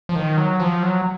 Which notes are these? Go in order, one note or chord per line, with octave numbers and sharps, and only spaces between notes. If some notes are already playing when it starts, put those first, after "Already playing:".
F3
D#3
F#3
F3
F#3